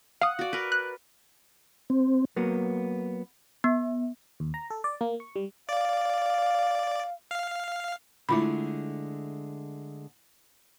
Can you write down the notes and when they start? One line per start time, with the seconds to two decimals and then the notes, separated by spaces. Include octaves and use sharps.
0.21 F5 F#5 D#6
0.39 F#4 D5
0.53 A#4 B4
0.72 F#6
1.90 C4
2.36 F#3 A#3 B3
3.64 B3
4.40 D#2
4.54 A#5
4.70 A4
4.84 D5
5.01 A#3
5.20 C#6
5.36 G3
5.69 D5 F5
7.31 F5
8.29 D3 G#3 A3 E4 F4 B5